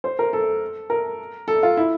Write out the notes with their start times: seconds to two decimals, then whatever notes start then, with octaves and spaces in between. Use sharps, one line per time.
0.04 C5
0.19 A#4
0.33 A4
0.90 A#4
1.48 A4
1.63 F4
1.77 E4